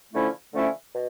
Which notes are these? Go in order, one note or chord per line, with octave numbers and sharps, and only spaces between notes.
D3 F3 A3 C#4 E4
D3 F3 A3 C#4 E4
B2